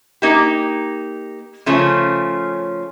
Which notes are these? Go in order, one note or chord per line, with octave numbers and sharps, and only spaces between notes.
A#3 D#4 G4
C#3 F3 A3 C#4